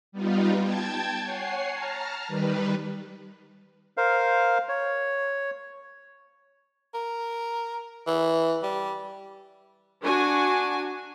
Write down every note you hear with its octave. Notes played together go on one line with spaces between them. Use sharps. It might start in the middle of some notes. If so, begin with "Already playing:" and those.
G3 B3 D#4 F4
G5 A5 G#6
C#5 F#5 G#5 C7
A5 A#5 F6
D#3 G3 B4
A#4 C5 F5
C#5
A#4
E3
G3
D4 F#4 G#5